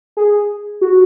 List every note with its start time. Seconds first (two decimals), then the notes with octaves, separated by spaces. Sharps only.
0.17 G#4
0.81 F#4